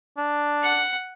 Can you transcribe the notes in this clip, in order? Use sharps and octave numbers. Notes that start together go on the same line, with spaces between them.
D4
F#5